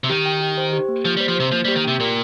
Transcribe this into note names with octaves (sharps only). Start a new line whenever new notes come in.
C3
D#3 G4
G5
G4
C5
G4
A#3
F3 G4
G3
C5
F3
C3 C5
F3 A#3
G3
G4
D#3
C3 G5
A#2 A#4